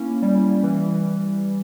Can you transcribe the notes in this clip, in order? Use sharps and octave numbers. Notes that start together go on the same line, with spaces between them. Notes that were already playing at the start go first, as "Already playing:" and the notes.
Already playing: A#3 C#4 E4
G3
E3